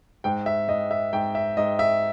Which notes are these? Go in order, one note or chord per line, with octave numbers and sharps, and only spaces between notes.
G#2 G5
E5
G#2 D#5
E5
G#2 G5
E5
G#2 D#5
E5